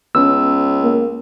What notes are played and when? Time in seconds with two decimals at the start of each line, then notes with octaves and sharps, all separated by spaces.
0.15 C#2 B3 C#4 E6
0.82 A#3